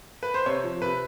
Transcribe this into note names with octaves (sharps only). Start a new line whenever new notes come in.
B4
C5
C3 C#5
F3
C3 B4